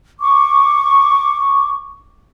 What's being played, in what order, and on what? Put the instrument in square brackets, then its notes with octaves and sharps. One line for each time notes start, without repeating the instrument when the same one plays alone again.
[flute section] C#6 D6